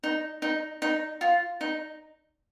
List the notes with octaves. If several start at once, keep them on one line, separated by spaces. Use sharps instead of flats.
D#4
D#4
D#4
F4
D#4